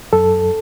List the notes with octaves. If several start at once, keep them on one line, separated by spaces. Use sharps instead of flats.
F#2 A4